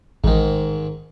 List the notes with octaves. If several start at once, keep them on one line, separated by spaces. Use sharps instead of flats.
A1 G#2 D#3